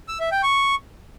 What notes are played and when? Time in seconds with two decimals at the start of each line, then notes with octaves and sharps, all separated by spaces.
0.08 E6
0.20 E5
0.32 G5
0.43 C#6